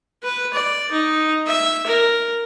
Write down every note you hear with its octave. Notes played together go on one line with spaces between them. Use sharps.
B4
D5
D#4
E5
A#4